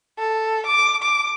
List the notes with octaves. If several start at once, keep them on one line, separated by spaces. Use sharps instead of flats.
A4
D6
D6